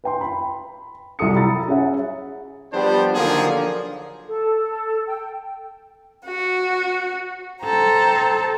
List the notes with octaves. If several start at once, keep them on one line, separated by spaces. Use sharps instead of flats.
B4 G5 C6
B5
C2 F#3 A4 D#6 C#7
A#5 B5 D#6 E6 A6
C#4 G#4 C#5 E5 F#5
F3 G3 B3 D4 G4 C5
D3 D#3 F3 F#3 A#3 G#4
A4
G5
F#4
A4 C5 G5 A#5